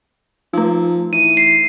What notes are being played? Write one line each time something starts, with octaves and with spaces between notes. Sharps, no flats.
F3 A3 D#4
E3 D#7
C7